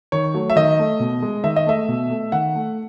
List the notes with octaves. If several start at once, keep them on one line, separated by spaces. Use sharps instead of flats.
D#3 C#5
F#3 A3
E5
D#3 D#5
A3
B2
G#3
D#3 E5
D#5
A3 E5
B2
A3
D#3 F#5
A3